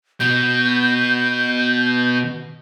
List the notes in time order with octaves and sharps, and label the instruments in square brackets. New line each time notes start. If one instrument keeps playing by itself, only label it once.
[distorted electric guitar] B2 [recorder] G6